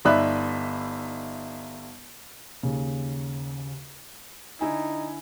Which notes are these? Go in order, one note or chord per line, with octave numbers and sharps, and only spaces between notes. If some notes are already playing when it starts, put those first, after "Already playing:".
G1 D#4 D5 E5 B5 F#6
D#2 C#3
D3 D#4 E4 G#5